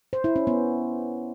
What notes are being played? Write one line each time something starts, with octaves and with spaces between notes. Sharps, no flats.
C5
E4
C#4
B3